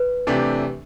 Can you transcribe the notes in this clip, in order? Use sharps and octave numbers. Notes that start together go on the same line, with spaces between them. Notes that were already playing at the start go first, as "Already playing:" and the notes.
Already playing: B4
C3 E3 A3 D4 G4